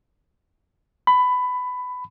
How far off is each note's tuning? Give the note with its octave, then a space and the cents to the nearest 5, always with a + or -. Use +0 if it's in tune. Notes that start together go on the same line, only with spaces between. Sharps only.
B5 +15